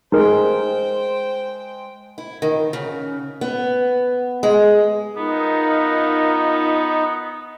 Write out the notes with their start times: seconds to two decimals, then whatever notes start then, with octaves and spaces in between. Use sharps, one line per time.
0.12 G#3 D#4 A#4 C5 G5
2.18 E4
2.42 D#3
2.73 C#3
3.41 B3
4.43 G#3
5.17 B3 D#4 F4 A#4